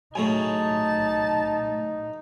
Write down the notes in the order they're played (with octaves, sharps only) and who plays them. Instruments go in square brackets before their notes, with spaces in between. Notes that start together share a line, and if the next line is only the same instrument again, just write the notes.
[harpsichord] F#2 A2 C#3 [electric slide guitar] A3 E5 G#5 [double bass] D#4 [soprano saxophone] A5